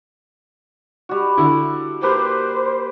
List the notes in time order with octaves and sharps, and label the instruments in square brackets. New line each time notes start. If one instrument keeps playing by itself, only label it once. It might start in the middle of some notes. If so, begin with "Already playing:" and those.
[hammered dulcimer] G3 F#4
[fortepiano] D3 E4
[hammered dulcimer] A#3 G4 B4 [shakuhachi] C5